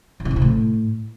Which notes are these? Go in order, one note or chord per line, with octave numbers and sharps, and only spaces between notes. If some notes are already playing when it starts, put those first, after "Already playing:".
D#3
D3
G2
C3
A2